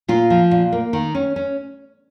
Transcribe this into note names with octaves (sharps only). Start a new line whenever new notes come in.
A#2 F4
F3
A#2
A#3
D#3
C#4
C#4